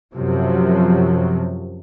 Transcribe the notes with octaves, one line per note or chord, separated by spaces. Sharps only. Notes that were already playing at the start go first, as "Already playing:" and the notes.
F#2 C3 F3 F#3